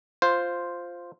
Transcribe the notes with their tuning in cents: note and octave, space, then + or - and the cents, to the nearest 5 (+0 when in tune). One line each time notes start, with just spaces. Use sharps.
F4 +0 C5 +0